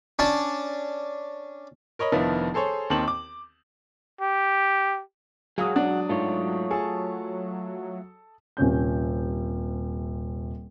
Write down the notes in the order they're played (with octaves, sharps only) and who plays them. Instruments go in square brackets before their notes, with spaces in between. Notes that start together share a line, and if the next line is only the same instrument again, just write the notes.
[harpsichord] C#4 D4 A5
[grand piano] A#4 C#5 D#5 B5
F1 D#3 F3 B3 D4 E4
G#4 A4 C5 C#5
D#2 D#3 C4 A5 F#7
D6
[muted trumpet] G4
[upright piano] E1 F#4 D#6 [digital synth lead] F#3 [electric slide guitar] G#4 F5
[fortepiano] D4 [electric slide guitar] F#5
[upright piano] G#2 [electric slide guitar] A3 F4 C#5
[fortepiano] G#4 [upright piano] A4 A5
[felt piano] D#1 C3 C#4 G6